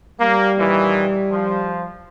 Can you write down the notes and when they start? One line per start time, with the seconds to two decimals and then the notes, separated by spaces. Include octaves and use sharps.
0.20 G3 A#3
0.58 A#2 D#3 E3
1.31 F3